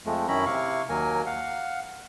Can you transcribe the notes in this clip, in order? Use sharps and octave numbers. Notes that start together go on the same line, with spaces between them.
F2 F3 G#3 A3
F#2 D#3 C#4 E4 A#5 B5
C3 E4 F5 C#6
D#2 F#3 A#3 A#4 G#5
F5 F#5